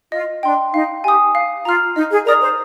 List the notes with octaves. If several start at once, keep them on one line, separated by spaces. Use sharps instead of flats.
F4 D#5
D4 G5 C6
D#4 F5
G4 G#5 D#6
F5
F4 A#5 F6
D#4 D#5
G#4
A#4 D5 A#5 D#6
C5